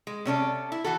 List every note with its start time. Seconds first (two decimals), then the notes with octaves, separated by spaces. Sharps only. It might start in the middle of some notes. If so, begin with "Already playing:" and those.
0.07 G#3
0.25 C3 C#4 A4 D5
0.72 E4
0.85 E3 F#4 A4